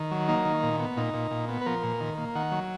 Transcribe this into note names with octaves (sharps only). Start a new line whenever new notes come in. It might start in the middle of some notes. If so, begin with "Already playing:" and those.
Already playing: D#3
F#3
A#3 D#4
D#3
A#2
B3
A#2 D#4
A#2
A#2
B3
B4
F3 A#4
A#2
D#3
A#3
D#3 F#5
F#3